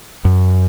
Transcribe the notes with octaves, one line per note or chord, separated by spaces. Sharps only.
F#2